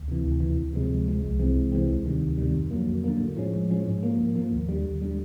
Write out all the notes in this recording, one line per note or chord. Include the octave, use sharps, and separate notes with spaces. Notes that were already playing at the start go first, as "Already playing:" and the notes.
Already playing: D2
C3 E3
D2
C3 E3
D2
C3 F3 G#3
D2
C3 F3 G#3
C2
C3 E3 G#3 C4
C2
C3 E3 G#3 C4
D2
C3 D#3 G3
D2
C3 D#3 G3
F2
D3 F#3 A#3
F2
D3 F#3 A#3
A2
F3 G#3 C#4
A2
F3 G#3 C#4
G#2
F3 A#3
G#2
F3 A#3
D#2
D3 G3
D#2
D3 G3